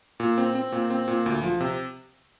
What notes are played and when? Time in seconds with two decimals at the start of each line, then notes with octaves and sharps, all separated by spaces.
0.20 A#2
0.38 C4
0.55 C4
0.72 A#2
0.90 C4
1.08 A#2
1.26 D2
1.43 F3
1.61 C3